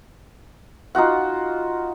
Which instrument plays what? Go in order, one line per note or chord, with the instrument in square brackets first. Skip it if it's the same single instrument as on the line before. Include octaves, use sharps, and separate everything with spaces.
[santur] D#4 F4 F#4 F#5